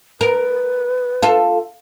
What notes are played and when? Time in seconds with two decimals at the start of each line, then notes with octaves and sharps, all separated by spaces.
0.21 A#4 B4
1.22 F4 A4